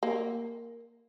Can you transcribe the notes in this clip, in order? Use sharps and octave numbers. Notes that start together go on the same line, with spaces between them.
A#3